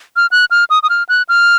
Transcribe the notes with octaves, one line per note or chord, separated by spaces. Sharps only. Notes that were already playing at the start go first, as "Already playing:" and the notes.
F6
F#6
F6
D#6
D#6
F6
F#6
F6